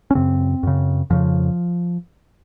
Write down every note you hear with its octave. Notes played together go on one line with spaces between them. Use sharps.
C#4
F#2 C#3 C4
F#2 C#3
F2 C#3 F3